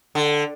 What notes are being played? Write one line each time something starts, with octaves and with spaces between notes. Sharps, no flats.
D3